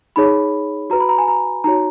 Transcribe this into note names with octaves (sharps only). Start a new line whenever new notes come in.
D#4 G#4 C#5 B5
F#4 B4 A#5
B5
A#5
G#5
A#5
D#4 F#4 C#5 A#5